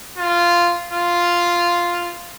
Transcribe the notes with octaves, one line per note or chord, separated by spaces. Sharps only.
F4
F4